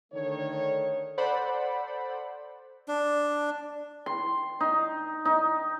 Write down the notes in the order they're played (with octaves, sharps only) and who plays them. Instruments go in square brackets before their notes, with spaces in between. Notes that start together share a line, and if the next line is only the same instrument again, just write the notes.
[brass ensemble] D3 D#3 A3 C#5
[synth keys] A4 C5 D5 F#5 B5
[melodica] D4
[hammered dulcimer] C6
D#4
D#4